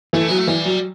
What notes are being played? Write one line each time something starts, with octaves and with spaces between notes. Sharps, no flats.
E3 A3
F#3 B3
A3
E3 G3
F#3